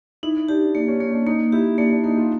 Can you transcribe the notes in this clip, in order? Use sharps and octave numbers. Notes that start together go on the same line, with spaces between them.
D#4 E4
D4 G4
A#3 D4
C#4
A#3 C#4
D4
A#3 D#4
E4 G4
A#3 D4
D4
A#3 D#4
F4